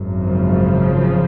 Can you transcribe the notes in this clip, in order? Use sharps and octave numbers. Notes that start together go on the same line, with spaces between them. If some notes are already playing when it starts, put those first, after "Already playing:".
Already playing: G#1 F#2
C#3 F3